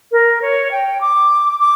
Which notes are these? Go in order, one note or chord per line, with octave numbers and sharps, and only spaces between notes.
A#4
C#5
G5
D6
D6